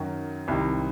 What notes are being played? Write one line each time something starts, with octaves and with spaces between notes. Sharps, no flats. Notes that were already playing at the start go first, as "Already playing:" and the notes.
Already playing: F#2 D#3 F#3
C2 C3 D#3